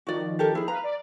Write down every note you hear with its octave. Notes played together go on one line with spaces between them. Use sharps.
D#3 F3 F#4 D5
G4 A4 A#4
E4 G#4
B4 F5 A#5
D5